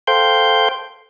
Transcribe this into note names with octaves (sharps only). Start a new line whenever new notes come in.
A4 C5 F5 G5 C6 G6